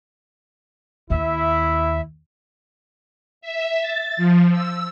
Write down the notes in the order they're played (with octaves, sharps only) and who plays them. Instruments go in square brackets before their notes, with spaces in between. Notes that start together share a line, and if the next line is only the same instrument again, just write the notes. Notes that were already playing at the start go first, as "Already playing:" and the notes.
[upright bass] D#2 [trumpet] E4 [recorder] E5
[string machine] E5
A6
F3
E6